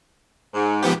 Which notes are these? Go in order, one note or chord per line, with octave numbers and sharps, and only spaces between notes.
G#2
F3 B3 G4